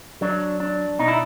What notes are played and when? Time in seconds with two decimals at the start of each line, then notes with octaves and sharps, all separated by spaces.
0.21 F#3 D4
0.60 D4
0.99 B2 D#4
1.08 E4